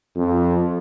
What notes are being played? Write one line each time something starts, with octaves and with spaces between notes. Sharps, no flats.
F2